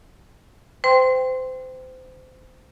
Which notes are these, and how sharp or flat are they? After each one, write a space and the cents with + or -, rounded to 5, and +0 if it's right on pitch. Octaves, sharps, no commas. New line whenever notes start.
C5 -30 G5 +0 C6 +0